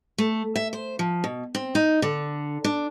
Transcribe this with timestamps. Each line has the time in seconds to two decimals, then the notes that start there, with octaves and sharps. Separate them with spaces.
0.18 A3
0.56 E5
0.73 C5
0.99 F3
1.24 B2
1.55 C4
1.75 D#4
2.02 D3
2.64 D4